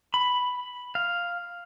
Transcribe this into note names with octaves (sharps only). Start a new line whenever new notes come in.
B5
F5